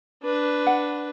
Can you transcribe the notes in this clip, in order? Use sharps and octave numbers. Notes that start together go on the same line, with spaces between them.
D4 B4
F#5